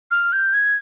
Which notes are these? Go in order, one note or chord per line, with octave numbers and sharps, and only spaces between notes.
F6
G6
G#6